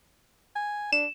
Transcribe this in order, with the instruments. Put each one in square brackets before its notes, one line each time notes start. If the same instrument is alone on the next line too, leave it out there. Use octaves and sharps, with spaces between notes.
[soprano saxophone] G#5
[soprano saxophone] D4 [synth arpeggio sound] E7